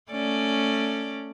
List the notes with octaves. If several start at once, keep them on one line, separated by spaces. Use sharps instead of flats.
A3 C#4 D5